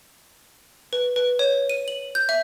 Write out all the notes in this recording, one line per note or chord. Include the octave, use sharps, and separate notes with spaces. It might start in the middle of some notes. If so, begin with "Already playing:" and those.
B4
B4
C#5
D#7
F#7
G6
E5